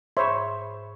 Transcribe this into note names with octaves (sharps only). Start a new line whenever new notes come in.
G#2 C5 C#5 E5 B5 C#6